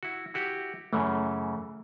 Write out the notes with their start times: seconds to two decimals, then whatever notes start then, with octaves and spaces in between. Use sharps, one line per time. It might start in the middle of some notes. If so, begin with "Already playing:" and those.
0.03 E4 F#4
0.34 E4 F#4 G4
0.93 F#2 C#3 E3 A3